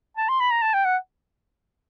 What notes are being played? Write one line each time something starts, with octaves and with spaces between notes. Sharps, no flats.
A5
C6
B5
A#5
A5
G5
F#5